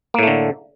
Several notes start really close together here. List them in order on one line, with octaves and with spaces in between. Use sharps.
A#3 A2 A3 D3